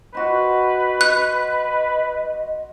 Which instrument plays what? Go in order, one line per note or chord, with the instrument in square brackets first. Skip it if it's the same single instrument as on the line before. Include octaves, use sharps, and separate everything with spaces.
[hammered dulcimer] F#4 C5 [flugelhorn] B4 [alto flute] D#5
[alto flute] D#5 [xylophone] F#6